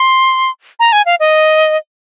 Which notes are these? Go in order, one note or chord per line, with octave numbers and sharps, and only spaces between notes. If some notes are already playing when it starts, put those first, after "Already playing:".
Already playing: C6
A#5
G#5
F5
D#5